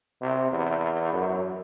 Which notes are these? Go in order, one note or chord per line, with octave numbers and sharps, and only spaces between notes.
C3
E2
F#2